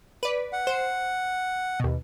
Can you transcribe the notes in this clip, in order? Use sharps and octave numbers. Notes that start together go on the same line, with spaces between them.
B4 D5
F#5
C5
D#2 B2